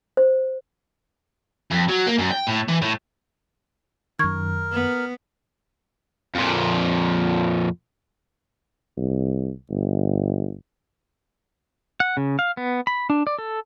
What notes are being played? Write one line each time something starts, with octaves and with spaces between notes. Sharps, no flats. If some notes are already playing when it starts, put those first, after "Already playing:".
C5
F2
F#3
A#3
F#2
G5
A2
E3
A2
F#2 D#3 A#4 C#6 G#6
B3
F2 A#2
C2
G1
F#5
C#3
F5
B3
B5
D4
D5
A4